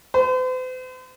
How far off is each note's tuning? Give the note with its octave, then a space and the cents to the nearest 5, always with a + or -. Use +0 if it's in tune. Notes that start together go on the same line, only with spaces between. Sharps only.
C5 -45